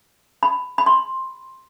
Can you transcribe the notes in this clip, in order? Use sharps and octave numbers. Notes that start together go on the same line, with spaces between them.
B5
B5
C6